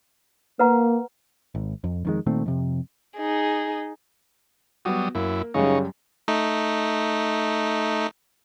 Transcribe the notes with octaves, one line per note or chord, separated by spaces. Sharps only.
A#3 B4 F#5 A#5
G#1
F2
F2 D#3 G#3
A#2 D#3 A3 C4
F2 C3
D#4 G#4
F#3 G3 B3 F#4 D#6
F#2 A#3 E4
F#2 C#3 F#3 G3 D#4 C#6
A3 D#4